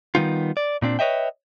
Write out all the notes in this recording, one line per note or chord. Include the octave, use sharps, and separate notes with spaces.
D#3 F#3 G3 B3 D#4 F4
D5
A#2 C4 D4
B4 C#5 D#5 E5 G5